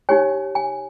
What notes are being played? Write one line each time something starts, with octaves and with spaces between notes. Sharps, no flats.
D#4 G4 C#5 G#5
G#5